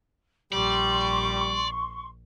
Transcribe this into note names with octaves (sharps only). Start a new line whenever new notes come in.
A#1 G3 D5 C6 C#6